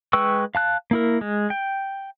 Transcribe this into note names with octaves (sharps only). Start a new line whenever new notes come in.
G#3 B4 G5 C#6 E6
F5 A5 F#6
A#3 E4 A#4
G#3
G5